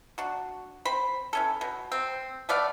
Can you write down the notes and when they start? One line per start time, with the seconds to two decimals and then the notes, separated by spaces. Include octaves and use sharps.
0.18 D4 F#4
0.85 C4 C5 B5
1.33 E3 C#4 A4
1.61 B2
1.92 C4
2.49 A3 B3 D5 F5